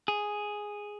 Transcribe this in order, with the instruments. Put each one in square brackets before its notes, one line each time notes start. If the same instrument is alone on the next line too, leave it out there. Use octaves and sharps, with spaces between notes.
[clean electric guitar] G#4